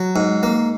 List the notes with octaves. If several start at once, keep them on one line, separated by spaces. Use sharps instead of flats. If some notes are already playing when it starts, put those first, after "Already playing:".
Already playing: F#3
G#2
A#3